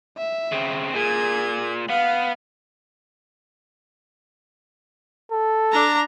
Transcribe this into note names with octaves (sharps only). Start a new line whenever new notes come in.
E5
C#3 C4
A#2 G#4 G#6
B3 F5
A4
D4 A#5